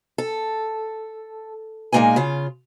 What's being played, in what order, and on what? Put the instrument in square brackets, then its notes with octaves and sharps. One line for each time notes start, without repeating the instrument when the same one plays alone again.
[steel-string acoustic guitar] A4
A#2 G#3 A#3 C#4 D#4 G#5
C#3 F4